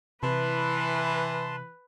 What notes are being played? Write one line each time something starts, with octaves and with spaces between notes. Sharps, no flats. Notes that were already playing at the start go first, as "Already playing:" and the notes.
C3 E3 B4 A5 C6